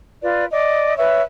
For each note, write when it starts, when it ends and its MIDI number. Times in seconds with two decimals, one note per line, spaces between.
0.22 0.44 65
0.22 0.44 71
0.22 0.44 74
0.51 0.96 74
0.51 0.96 75
0.97 1.21 71
0.97 1.21 73
0.97 1.21 76